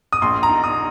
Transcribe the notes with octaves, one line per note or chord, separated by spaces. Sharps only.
D#6
A#1 C6
A#5
D#4
D#6